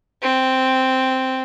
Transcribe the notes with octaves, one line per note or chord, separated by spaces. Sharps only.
C4